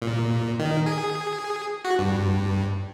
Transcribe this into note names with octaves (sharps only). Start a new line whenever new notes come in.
A#2
D#3
G#4
F#4
G2